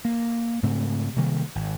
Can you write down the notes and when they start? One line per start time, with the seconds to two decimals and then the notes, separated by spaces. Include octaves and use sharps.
0.05 A#3
0.63 G#2 C#3 A3 C4
1.16 C3 D#3 G3 A#3
1.55 G#1